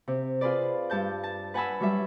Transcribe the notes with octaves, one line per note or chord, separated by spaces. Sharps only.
C3
F4 G#4 B4 D5
G2 A5 G6
A5
B4 F#5 G#5 A5 B5 E6
F#3 G3 E5